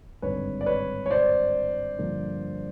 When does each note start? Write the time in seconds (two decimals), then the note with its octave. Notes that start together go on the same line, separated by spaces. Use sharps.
0.22 G#1 G2 D3 B4 C#5
0.61 D5
0.66 B4 C#5
1.06 C#5
1.11 C5 D5
1.99 G2 D3 F3 A#3